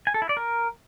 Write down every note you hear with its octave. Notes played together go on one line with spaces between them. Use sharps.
G#5
A4
E4
D5
A#4